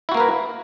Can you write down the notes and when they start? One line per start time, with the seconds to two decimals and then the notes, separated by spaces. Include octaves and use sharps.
0.09 E4
0.12 F#4
0.14 A#3
0.17 A#4
0.20 B4